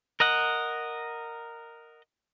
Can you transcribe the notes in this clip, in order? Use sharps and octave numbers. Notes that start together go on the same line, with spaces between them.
A#4 D#5 F#5